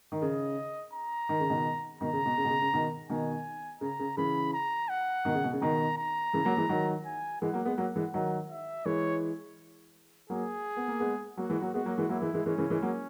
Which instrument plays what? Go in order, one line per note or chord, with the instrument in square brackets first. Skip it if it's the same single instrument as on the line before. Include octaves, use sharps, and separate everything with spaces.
[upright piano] D#3
[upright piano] C#3 [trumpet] D#5
[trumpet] A#5
[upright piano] D#3
C#3
B2 D#3
[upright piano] B2 D#3 [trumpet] A#5
[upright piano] C#3
B2
C#3
B2
C#3
C#3
B2 D#3
[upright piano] B2 D#3 [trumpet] G#5
[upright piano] C#3 [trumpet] A#5
[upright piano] C#3
[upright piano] C#3 E3 [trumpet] B5
[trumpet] A#5
F#5
[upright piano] B2 D#3
C#3
B2
C#3
[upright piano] B2 D#3 [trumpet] A#5
[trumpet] A#5
[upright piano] C#3 E3
F#3 A#3
E3 G#3
D#3 F#3
[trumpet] G#5
[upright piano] E3 G#3 [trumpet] F#5
[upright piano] F#3 A#3
G#3 B3
F#3 A#3
E3 G#3
D#3 F#3
[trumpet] E5
[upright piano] E3 G#3 [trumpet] C#5
[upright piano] F#3 A#3 [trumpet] G#4
[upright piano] B3
A#3
G#3 B3
[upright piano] F#3 A#3 [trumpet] F#4
[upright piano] E3 G#3
F#3 A#3
[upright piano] G#3 B3 [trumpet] F#4
[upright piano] F#3 A#3
E3 G#3
[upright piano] F#3 A#3 [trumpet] E4
[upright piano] E3 G#3
E3 G#3
[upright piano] E3 G#3 [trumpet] C#4
[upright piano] C#3 E3
E3 G#3
F#3 A#3